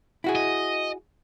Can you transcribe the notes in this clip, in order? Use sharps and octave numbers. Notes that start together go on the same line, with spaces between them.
E4 F#4 G#4
D#5